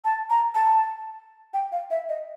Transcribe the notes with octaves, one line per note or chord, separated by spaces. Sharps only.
A5
A#5
A5
G5
F5
E5
D#5